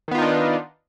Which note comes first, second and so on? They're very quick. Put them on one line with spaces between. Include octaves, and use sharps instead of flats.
D#3 B3 F4 D#4 D4